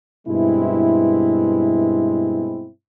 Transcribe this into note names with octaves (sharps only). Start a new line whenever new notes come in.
G2 B2 G#3 C4 E4